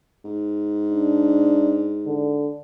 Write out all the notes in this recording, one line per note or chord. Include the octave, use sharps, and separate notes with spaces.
G#2
D4
D3